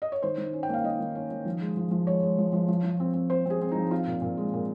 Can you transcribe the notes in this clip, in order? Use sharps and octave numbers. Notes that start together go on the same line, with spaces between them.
D#5
C#5
D#3 C5
D#3
C#4
G5
A#3 F5
D#3 D#5
D#3
C#4
D#3
F3
G#3
F3
F3
G#3 C#5
G#3
F3
F3
F3
F3
C4
C4
C4 C5
C4 G#4
C4
F3 D#4
C4 F4
A#2
A#2
G#3
A#2